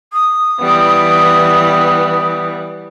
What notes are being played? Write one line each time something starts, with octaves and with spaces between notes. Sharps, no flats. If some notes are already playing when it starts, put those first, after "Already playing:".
D#6
E3 G3 B3